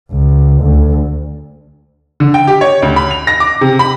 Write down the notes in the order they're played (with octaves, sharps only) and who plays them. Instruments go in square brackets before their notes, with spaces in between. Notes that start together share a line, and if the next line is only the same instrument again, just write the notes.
[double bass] C#2
D2
[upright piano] D3
G5
G4
C#5
D2
B5
F7
A#6
D6
C3
B5